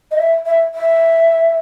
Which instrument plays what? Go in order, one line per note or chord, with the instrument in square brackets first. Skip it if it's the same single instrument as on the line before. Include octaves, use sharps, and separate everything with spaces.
[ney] D#5
E5
E5
E5